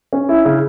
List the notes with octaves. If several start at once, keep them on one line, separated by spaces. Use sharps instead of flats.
C#4
E4
C#3